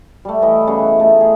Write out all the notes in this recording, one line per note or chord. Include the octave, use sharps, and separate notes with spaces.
G3 A3
E3 E4 D#5
C#3 G3 B3
F#5
A3 D#4 F4
G#4